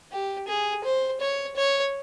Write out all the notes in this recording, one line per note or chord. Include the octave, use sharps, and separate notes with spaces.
G4
G#4
C5
C#5
C#5